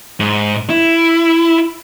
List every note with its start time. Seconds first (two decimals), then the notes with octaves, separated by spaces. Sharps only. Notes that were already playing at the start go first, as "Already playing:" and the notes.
0.20 G#2
0.69 E4